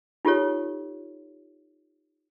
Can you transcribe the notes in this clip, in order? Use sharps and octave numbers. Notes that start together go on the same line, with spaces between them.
D#4 F4 G4 A4 C#5